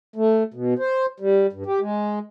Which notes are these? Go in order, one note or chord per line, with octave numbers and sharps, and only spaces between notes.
A3
B2
C5
G3
G2
G4
G#3